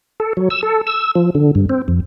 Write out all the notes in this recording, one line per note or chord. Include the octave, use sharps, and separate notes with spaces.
A4
F#3
E6
A4
E6
F3
D3
G2
C4
F2